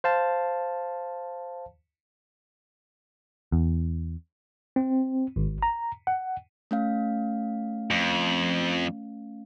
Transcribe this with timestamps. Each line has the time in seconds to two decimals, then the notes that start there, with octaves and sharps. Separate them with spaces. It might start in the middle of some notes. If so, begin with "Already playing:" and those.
0.04 C5 F5 A5
3.52 E2
4.76 C4
5.36 G#1
5.63 A#5
6.07 F#5
6.71 A3 C#4 F5
7.91 F2